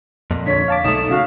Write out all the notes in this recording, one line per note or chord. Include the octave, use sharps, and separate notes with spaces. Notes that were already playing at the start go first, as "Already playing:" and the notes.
F2 A#2
D3 C#5 B6
F5 A5 D6
B1 A3 D#4 D#6 E7
C#3 F#4 F5